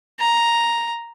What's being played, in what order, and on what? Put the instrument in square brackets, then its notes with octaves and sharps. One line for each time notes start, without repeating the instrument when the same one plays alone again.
[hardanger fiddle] A#5